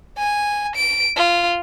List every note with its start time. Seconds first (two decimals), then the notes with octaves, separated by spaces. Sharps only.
0.18 G#5
0.76 D7
1.17 F4